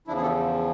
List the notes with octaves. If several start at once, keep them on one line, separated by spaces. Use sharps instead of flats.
E2 C#3 F3 D4 E4
G#4
G4 A4